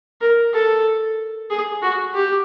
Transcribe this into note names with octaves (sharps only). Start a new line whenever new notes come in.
A#4
A4
G#4
F#4
G4